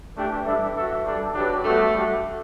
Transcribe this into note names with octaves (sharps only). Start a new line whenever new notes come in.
E3 A3 D4 G4
G3 D4 A4 E5
F#4 A4 E5
G3 D4 A4
F#3 D4 G4 B4
G3 A3 B3 F#4
G3 D4 F#4